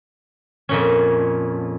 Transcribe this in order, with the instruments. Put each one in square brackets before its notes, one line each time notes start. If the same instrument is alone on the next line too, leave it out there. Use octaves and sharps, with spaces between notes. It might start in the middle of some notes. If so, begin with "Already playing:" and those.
[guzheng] F2 A#2 C#4